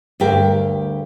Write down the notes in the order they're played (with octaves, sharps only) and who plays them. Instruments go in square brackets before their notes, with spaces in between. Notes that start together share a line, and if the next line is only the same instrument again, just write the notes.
[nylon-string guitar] D2 G2 G4 A#4